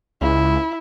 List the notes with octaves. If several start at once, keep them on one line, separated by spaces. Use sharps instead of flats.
C#2 E4